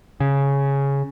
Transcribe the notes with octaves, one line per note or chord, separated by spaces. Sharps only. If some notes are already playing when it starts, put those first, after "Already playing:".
C#3